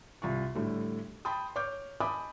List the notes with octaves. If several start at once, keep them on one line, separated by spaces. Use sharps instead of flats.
C2 F4 C#6
A2 D3 G3 A3
G5 A5 B5 C6 D#6
C#5 C#6 D6 F6 G6
D#5 G#5 A5 B5 D6 D#6